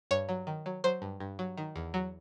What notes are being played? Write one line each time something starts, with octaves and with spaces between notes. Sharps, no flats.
G2 C#5
F#3
D#3
F#3
F#3 C5
G2
G2
F#3
D#3
E2
F#3